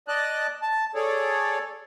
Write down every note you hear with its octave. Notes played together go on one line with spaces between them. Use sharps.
D5 D#5 A5 F#6
A5
G#4 A4 C#5 D5